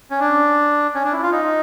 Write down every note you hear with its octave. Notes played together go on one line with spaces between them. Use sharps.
C#4
D4
C#4
D4
E4
F4
D#4